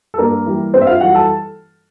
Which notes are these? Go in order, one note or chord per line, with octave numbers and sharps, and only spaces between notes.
A4
G2 A#3 A#4
E3 G3
G2 C4 C5
E5
F4 F5
E3 G3 F#4 F#5
A4 A5